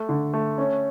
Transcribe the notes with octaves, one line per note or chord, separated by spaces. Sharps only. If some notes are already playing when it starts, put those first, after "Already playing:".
Already playing: A3
D3
A3
C#4